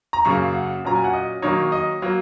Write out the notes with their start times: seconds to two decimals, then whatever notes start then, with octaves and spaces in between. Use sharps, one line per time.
0.13 A#5
0.25 F#2 C#3 A#3 C#6
0.55 F#5
0.84 A#2 F#3 C#4 A#5
0.95 G#5
1.04 F#5
1.13 D#5
1.42 D#3 F#3 A#3 D#4 C#5
1.72 D#5
2.02 F#3 A#3